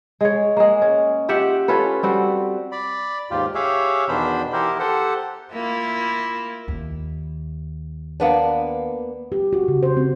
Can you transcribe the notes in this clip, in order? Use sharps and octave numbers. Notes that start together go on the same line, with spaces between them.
G#3 C#5
G#3 A#3
C#4
F4 G4 E5 F#5
C#4 F4 A4 B4
G3 C4 F#4
D5 B5
D#2 G#2 F4 G4
G4 G#4 C#5 E5 F5
E2 B2 D#3 D4 C5 B5
E3 B3 E4 G4 A#4 C5
G4 A4 C5 F#5
A#3 E4 F4
D#2
A#3 B3 D4
G4
F#4
C#3
C5
C4